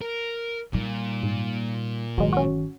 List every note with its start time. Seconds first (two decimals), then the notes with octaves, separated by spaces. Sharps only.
0.01 A#4
0.73 A#2 G3 D#4
1.23 G#2
2.18 G1 D#3 F#3 G#3
2.33 C#4 F#4